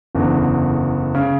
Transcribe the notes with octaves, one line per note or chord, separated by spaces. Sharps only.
F#1 E2 D3
C#3